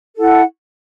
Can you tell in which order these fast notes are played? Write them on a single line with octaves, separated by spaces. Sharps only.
A4 E4 F#5